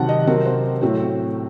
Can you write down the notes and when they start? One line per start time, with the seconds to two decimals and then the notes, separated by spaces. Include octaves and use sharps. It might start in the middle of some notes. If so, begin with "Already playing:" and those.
Already playing: C3 D#3 F#3 C4 F#5 A5
0.09 D#5
0.27 C3 F#3 C4 A#4
0.46 C5
0.81 A2 F#3 A3 C4 F#4